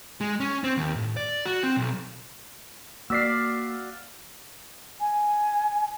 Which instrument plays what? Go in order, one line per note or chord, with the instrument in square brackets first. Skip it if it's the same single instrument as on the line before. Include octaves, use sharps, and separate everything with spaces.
[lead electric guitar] G#3
C#4
C4
D#2
A2
D5
F#4
C4
B1
[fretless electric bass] A#3 [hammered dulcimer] F#4 D5 F5 [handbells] E6 B6 C7
[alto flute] G#5